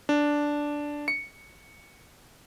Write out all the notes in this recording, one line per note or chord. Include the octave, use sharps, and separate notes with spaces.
D4
C#7